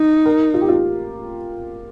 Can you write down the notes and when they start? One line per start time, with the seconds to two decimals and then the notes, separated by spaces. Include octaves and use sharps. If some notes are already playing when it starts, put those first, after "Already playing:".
Already playing: D#4
0.26 A#4
0.54 F4
0.61 G4
0.69 F4